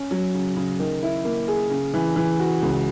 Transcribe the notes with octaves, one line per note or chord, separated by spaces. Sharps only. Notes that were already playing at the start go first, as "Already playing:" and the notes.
Already playing: C#4
F#3
C#3
C#3
D#3
E4
A#3
G#4
C#3
E3
E3
F#4
C#2